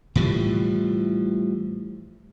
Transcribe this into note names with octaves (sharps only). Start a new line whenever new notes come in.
A2 E3 F3 G3